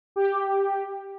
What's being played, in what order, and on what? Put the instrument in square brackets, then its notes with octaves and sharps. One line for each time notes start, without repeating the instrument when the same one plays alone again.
[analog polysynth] G4